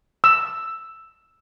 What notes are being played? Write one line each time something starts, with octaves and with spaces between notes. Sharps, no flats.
E6